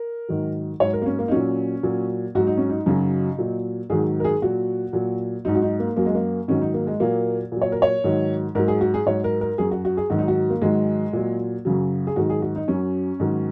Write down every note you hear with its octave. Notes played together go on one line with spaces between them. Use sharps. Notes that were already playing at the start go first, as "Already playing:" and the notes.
Already playing: A#4
G#2 D#3 F#3
G#2 F#3 C#5
A#4
A#3
C#4
A#3
D#4
A#2 F#3 C#4
A#2 F#3
G#2 F#3 F#4
D#4
C#4
D#4
F#2 C#3 F#3
A#2 F#3
G#2 D#3 F#3 G#4
A#4
G#4
A#2 F#3 F#4
A#2 F#3
G#2 F#3 D#4
F#4
D#4
A#3
F#2 F#3 A#3
G#3
A#3
G#2 D#3 F#3 C#4
D#4
A#3
G#3
A#2 F#3 A#3
A#2 F#3
C#5
A#4
C#5
G#2 D#3 F#3
G#2 F#3 A#4
G#4
F#4
G#4
G#2 F#3 C#5
A#4
A#4
F#2 F#3 G#4
F#4
F#4
G#4
G#2 D#3 F#3 F#4
D#4
F#4
A#3
G#2 D#3 F#3 G#3
A#2 F#3
F#2 C#3 F#3
G#4
G#2 D#3 F#3 F#4
G#4
F#4
D#4
F#2 F#3 C#4
G#2 D#3 F#3